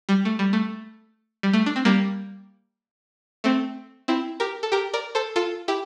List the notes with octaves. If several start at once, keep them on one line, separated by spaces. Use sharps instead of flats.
G3
A3
G3
A3
G3
A3
D4
C4
G3 A#3
A3 C4
C4 E4
G4 A#4
A4
G4 A#4
A#4 D5
A4 C5
F4 A4
E4 G4